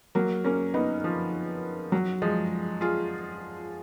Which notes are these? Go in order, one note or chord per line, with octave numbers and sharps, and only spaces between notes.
F#3 A#3
A#3 C#4
B3 D#4
F3
F#3
F3 G#3
F4 G#4